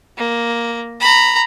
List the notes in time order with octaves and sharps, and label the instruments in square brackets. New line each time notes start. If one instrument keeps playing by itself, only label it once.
[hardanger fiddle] A#3
A#5 B5